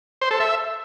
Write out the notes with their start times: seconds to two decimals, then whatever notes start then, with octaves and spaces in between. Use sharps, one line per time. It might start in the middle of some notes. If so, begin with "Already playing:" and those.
0.22 C5
0.31 A4
0.40 E5